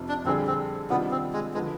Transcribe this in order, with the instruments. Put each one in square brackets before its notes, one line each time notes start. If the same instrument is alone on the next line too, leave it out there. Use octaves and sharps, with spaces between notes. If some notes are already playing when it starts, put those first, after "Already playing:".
Already playing: [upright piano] F1 F2 C3 F3
[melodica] D4
[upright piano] F2 D3 G3 D4 G#4 [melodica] C4
[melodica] C4
[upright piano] C3 D#3 G3 D4 F4 [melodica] B3
[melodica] C4
G#3
[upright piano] D3 F3 B3 [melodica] G#3